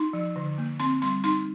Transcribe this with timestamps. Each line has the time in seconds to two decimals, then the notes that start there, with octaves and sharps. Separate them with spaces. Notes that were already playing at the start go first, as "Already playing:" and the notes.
Already playing: D#4 C6
0.13 F3
0.36 D3
0.58 A#3
0.80 C4 C6
1.02 G3 C6
1.24 D#4 C6